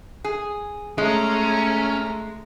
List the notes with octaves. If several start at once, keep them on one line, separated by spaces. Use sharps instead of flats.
G#4
G#3 A3 C#4 A#5